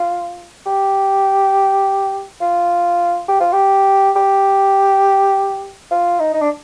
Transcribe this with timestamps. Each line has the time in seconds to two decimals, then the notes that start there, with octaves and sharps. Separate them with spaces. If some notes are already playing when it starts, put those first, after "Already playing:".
Already playing: F4
0.66 G4
2.42 F4
3.29 G4
3.40 F4
3.53 G4
4.16 G4
5.91 F4
6.20 D#4
6.34 D#4
6.42 D4